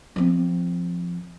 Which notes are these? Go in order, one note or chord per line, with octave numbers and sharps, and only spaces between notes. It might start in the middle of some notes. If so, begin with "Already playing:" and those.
F3 C4